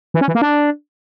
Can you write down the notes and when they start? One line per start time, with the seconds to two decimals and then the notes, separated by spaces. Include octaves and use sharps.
0.14 E3
0.21 C#4
0.28 E3
0.35 A#3
0.42 D4